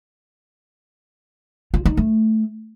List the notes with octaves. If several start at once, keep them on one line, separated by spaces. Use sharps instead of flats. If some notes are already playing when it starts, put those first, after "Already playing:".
F4
D#4
A3